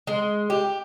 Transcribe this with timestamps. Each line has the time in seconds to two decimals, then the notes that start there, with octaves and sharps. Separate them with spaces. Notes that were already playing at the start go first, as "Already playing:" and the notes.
0.07 G#3
0.50 G4